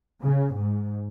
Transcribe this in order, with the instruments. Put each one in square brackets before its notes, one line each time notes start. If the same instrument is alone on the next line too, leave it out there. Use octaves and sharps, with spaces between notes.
[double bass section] C#3
G#2